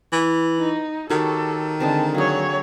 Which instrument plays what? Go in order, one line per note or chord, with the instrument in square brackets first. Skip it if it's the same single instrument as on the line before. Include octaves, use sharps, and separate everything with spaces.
[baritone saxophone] E3
[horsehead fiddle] D#4
[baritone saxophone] D#3 [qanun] F#4 G4 C#5 [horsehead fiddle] A4
[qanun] D3 G#3 C4 [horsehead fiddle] A5
[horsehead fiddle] F#3 C#5 [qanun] A#3 G#4